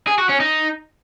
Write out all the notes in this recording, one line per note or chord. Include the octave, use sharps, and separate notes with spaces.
G#4
F#4
C#4
D#4